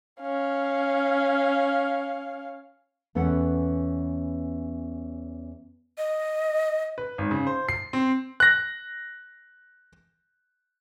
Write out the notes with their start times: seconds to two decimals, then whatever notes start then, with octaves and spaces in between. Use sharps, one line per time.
0.20 C#4 F5
3.15 E2 B3 C#4 A4 F#5
5.98 D#5
6.98 B4
7.18 G#1
7.31 C#3
7.47 C5
7.69 C7
7.93 C4
8.40 F#6 A#6